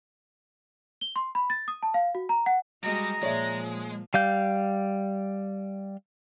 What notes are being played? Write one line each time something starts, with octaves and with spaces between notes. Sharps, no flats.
G7
C6
B5
A6
D#6
A5
F5
F#4
A#5
F#5
G3 G#3 F#4 D#5 A#5
A#2 F3 G#3 C#5 D5 E5
G3 F5 G6